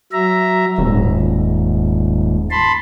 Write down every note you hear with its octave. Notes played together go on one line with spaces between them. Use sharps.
F#3 E5 A#5
D#1 G#2
A5 B5 C6